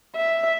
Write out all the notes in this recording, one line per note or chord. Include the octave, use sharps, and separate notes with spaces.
E5